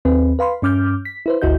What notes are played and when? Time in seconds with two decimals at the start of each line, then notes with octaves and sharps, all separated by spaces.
0.05 D#2 C4 B4
0.39 B4 F5 B5 C6
0.62 G2 C#4 D6 F6 G6
1.05 B6
1.26 E4 B4 C5
1.42 G#1 D2 E4 F#4 D#5 G6